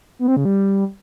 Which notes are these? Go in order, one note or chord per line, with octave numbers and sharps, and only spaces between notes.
B3
C4
C#3
G3